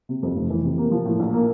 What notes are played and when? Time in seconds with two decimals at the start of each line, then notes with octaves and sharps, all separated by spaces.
0.09 C3
0.23 F2
0.36 F1
0.50 E3
0.64 C3
0.78 A#3
0.91 F3
1.05 A2
1.20 A#1
1.33 A#3